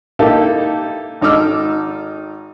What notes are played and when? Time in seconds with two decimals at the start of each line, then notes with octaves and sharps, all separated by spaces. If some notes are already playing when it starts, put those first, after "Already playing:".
0.19 A#3 D#4 E4 G4 A4
1.21 G#1 D#4 A4 D6 E6 F6